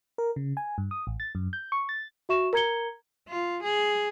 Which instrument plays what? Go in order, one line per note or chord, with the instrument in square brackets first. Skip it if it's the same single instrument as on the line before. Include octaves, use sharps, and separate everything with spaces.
[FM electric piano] A#4
C#3
G#5
G2
D#6
A1
A6
F#2
G6
C#6
A6
[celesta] F#4 E5 C#6 E7
A#4 A#5 G#6 C#7 G7
[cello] F4
G#4